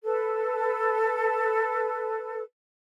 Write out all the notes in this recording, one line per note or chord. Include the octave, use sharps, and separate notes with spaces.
A4 B4